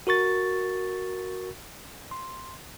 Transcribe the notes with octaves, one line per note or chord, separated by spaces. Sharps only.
F#4 A#4 C#6 A6
C6